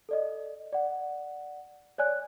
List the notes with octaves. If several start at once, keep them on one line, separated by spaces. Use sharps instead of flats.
A4 D5 D#5
D5 F#5
C#5 D5 G#5 F#6